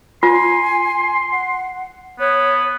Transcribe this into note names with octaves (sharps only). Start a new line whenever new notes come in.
F4 G#5 C6
F#5
B3 C#5